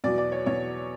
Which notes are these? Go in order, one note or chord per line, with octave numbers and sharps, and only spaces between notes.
E2 B2 F#3 D5
D5
C#5
E2 B2 F#3 C#5